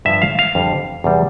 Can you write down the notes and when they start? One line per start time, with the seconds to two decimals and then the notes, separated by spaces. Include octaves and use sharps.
0.05 G2 F3 E5
0.22 F5
0.39 F5
0.55 F2 D3 G3
1.04 E2 C3 G3